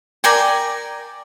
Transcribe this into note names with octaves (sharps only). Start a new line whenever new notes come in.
A#4 D5 G5 G#5